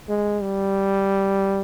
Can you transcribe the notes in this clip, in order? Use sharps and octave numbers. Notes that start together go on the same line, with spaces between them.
G#3
G3